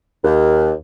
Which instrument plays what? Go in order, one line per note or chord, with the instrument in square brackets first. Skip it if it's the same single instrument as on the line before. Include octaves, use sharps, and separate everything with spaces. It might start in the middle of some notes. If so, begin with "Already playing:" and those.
[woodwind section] D#2